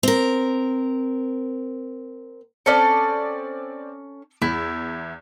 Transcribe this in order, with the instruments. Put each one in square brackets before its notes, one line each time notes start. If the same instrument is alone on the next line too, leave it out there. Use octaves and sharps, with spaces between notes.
[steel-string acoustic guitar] C4 A#4
[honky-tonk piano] C4 D5 [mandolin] C#4 A4
[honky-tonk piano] E2 [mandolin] E4